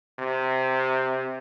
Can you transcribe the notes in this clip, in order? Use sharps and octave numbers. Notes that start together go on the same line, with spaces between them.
C3